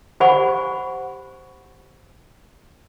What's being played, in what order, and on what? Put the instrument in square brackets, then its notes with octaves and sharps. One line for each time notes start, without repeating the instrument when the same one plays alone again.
[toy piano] G4 C5 F#5 G#5 B5 C#6